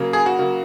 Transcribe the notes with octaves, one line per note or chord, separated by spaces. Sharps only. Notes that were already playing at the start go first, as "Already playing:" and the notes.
Already playing: C#3 F#3 A#3
G#4
F#4
C#3 F#3 A#3